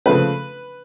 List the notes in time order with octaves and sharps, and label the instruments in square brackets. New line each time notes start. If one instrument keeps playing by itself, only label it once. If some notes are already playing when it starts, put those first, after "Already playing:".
[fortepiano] C#3 F3 A3 B4